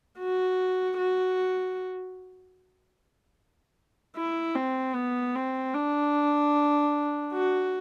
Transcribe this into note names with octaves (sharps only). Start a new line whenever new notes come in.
F#4
F#4
E4
C4
B3
C4
D4
F#4